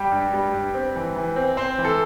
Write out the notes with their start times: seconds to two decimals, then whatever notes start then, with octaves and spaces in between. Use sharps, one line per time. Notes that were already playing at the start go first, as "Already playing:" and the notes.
Already playing: G3 G4 G5
0.12 G2
0.34 G3
0.54 G2
0.74 C4
0.96 E3
1.16 E3
1.36 C4
1.57 C4 C5
1.78 E3
1.85 A4